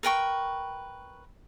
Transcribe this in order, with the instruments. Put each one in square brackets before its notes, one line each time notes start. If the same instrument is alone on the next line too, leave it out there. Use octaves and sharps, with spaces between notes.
[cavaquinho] A#4 B4 G5 C#6